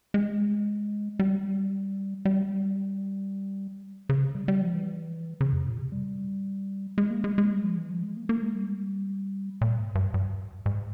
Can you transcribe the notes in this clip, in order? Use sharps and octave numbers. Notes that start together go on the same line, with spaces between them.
G#3
G3
G3
C#3
G3
G3
F3
E3
C#3
F2
A#2
C3
G3
G#3
A#3
G#3
G#3
G3
F3
E3
F3
G#3
A#3
A#3
G#3
G3
A#2
G#2
G2
G2
G#2